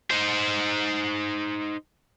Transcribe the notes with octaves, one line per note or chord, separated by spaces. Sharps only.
D#4 C5